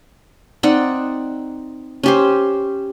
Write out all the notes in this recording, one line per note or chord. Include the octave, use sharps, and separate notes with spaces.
C4 D#4 D5 F#5
C#4 G4 C5